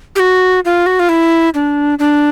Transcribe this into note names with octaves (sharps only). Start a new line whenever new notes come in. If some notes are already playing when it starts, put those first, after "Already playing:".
G4
F#4
F4
F#4
F4
E4
D4
D4